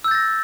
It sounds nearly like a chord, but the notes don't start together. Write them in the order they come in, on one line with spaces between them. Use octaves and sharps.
E6 G6 A6 A#6